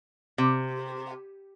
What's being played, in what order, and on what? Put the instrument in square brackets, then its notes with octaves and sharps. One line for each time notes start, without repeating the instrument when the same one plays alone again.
[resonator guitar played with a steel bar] C3